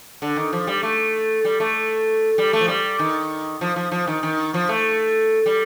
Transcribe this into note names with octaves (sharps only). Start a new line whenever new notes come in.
D3
D#3
F3
G3
A3
G3
A3
G3
A3
F3
G3
D#3
F3
F3
F3
D#3
D#3
F3
A3
G3